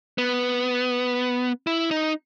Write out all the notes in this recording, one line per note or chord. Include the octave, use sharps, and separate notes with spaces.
B3
E4
D#4